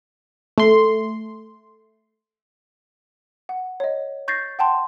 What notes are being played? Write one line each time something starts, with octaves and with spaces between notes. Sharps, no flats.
A3 C6
F#5
C#5 D#5
C#6 G6 A6 A#6 C7
F#5 G5 A5 C6